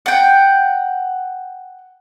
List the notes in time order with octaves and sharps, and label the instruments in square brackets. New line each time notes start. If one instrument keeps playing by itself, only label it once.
[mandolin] F#5 G5